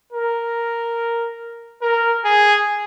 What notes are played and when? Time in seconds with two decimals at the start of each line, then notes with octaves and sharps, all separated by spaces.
0.12 A#4
1.82 A#4
2.24 G#4